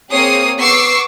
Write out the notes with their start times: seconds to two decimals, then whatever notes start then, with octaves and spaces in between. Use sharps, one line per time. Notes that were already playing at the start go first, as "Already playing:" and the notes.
0.11 A#3 C4 G#4 C#5 D#6 C7
0.59 B3 C#6 D6 E6 C7